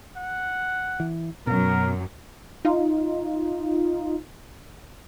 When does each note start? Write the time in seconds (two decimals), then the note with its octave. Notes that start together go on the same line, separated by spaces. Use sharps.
0.17 F#5
1.00 E3
1.47 F#2 B2 F#3 A#4
2.65 D#4 F4